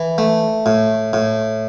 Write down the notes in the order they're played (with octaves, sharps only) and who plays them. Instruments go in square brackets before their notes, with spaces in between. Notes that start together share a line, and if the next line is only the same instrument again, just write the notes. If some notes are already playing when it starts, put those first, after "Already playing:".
Already playing: [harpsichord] E3
A3
A2
A2